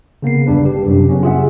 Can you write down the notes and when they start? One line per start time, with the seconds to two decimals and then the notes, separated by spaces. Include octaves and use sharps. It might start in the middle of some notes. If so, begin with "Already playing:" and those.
0.22 C#3 A#3 B3 C7
0.47 G1 E2 G3 D4 B4
0.66 G4
0.86 F#2 C3 F#3 G3 D4
1.09 C#3 F#3 B3 C#4
1.23 F4 G4 G#4 E5 F#5